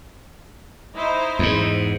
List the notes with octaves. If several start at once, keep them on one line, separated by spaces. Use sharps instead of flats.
D#4 E4 C5
E2 G#2